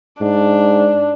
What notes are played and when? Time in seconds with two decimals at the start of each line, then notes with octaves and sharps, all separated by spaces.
0.21 G#2 D4